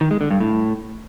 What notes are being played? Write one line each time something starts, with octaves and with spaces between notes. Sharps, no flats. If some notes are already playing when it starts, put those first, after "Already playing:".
D#3
G#3
D3
G2
A2